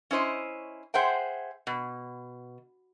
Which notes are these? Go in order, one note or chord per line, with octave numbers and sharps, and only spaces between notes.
C#4 E4 C5 D#5
G#4 C5 E5 F#5 G5
B2